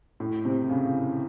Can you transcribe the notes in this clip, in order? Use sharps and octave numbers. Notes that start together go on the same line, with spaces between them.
A2
C3
C#3